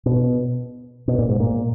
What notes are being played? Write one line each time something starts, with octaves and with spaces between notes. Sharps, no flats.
B2
B2
A#2
G#2
A#2